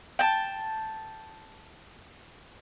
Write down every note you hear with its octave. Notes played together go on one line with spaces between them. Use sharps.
G5 A5